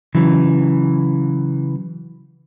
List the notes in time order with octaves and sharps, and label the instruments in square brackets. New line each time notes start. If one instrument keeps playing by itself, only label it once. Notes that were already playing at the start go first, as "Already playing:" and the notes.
[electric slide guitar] C#3 E3 F#3